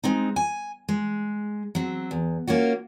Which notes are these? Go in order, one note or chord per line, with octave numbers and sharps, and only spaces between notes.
G#3 C4 D#4
G#5
G#3
F#3 C4
E2
A#3 C#4 F4 F#4